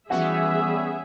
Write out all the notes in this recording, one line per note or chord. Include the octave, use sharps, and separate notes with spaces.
E3 G3 B3 C#4 F#4 G#4 E5